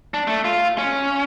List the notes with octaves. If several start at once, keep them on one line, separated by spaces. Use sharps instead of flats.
D4
A3
F4
C#4